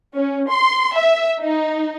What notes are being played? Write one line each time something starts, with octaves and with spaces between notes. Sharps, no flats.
C#4
C6
E5
D#4